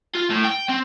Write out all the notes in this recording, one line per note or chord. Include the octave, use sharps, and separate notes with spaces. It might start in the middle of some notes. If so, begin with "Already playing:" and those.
F4
A2
G5
C4